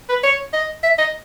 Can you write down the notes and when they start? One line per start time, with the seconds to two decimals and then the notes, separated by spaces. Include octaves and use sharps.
0.09 B4
0.23 C#5
0.53 D#5
0.83 E5
0.98 D#5